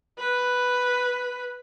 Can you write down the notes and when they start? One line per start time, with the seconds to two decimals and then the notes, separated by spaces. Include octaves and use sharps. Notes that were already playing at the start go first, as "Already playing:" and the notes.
0.19 B4